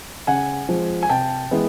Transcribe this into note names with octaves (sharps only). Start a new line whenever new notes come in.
C#3 F#5 G#5
F3 G#3 C4
G#5
C3 G5 A5
E3 G#3 B3